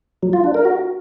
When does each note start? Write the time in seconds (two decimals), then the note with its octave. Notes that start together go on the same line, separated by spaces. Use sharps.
0.23 F#3
0.33 F4
0.44 D4
0.54 A#4
0.65 F#4